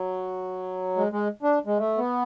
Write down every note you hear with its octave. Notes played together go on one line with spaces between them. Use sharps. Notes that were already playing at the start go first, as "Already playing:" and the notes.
Already playing: F#3
G#3
G#3
D4
G#3
A3
B3